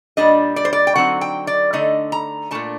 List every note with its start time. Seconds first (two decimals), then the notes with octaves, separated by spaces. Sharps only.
0.17 A#2 G3 D4 D#5
0.56 D5
0.65 C5
0.73 D5
0.87 G5
0.95 D3 F#3 C4 D#4 F#5
1.21 G5
1.47 D5
1.73 D3 A3 D#4 D#5
2.12 A#5
2.51 A#2 A3 D4 A5